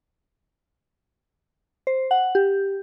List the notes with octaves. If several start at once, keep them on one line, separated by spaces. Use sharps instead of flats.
C5
F#5
G4